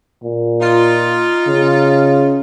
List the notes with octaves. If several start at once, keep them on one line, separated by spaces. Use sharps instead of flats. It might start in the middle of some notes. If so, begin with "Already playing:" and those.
A#2
D#4 F4
C#3